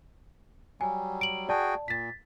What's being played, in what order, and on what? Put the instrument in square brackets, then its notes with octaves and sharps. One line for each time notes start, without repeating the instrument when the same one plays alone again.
[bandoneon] F#3 G3 [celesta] G#5
[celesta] D7 F#7
[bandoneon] F#4 G#4 G5 [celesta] D5 A5
[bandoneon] A#2 [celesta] A6 B6